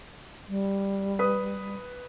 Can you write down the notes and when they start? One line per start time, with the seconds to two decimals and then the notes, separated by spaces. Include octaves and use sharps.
0.49 G3
1.19 B4 D#6